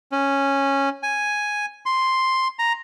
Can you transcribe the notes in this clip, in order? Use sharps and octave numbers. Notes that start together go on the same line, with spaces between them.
C#4
G#5
C6
A#5